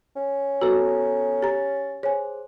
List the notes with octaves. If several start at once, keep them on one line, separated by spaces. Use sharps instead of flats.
C#4
B3 F#4 A4 B4 A#5
G4 A#5 A6
G#4 C5 C#5 G#5